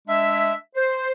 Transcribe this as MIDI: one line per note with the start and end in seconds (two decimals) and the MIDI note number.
0.08 0.53 56
0.08 0.53 62
0.08 0.53 76
0.76 1.12 72